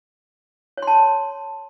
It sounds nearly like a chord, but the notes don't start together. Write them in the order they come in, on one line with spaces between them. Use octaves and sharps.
C#5 C6 A5